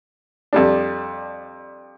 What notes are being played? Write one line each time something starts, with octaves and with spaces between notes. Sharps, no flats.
F2 G3 D4